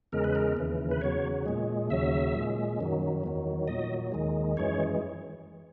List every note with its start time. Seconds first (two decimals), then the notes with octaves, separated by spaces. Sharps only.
0.12 E2 C#3 G#3 A#4
0.24 B4
0.35 A#4
0.57 D#2 C#3 E3
0.91 B4
1.01 E2 C#3 F#3 C#5
1.46 A#2 G#3
1.90 D#2 C#3 F#3 E5
2.34 A#2 G#3
2.80 F#2 D#3 F#3
3.24 E2 D#3 F#3
3.68 A#2 F#3 D#5
4.12 D#2 D#3 G#3
4.57 F#2 E3 G#3 C#5